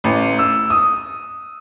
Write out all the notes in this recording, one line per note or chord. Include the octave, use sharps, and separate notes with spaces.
A1
E6
D#6